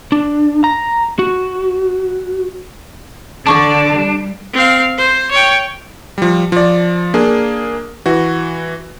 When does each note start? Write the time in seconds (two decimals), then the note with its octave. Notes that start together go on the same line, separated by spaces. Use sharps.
0.12 D4
0.64 A#5
1.19 F#4
3.47 D3 D4 D5 A5 C#6 D6
3.93 G3
4.53 C4 F5
4.98 C5
5.31 C#5 G5
6.18 F3 G3
6.52 F3 D5
7.14 A#3 D4 G#4
8.06 E3 F#4